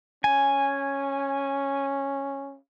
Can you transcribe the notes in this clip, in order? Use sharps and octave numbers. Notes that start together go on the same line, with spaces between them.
C#4 G#5